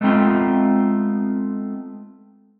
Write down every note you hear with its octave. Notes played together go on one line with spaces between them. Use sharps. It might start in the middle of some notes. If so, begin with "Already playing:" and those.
G#3 A3 B3 C4 D#4 F4